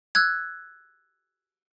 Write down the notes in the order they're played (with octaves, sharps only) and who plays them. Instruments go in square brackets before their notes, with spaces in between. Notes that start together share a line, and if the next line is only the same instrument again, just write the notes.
[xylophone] E6 F#6 G#6